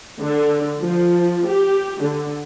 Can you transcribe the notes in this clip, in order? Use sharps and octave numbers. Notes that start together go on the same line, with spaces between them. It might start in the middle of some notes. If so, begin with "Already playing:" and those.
D3
F3
G4
D3